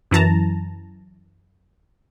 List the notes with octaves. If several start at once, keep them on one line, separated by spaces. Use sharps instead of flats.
F#2 E3 A5 A#5